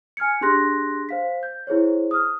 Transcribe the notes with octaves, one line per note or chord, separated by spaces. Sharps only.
G#5 F6 G#6 C#7
D4 G4 G#4 C6 F#6 A#6
C5 F5 B6
G6
E4 G#4 C5 C#5
D#6 F6